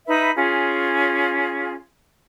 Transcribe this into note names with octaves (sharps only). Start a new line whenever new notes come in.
D#4 B4 E5 B5
C#4 F4 G#4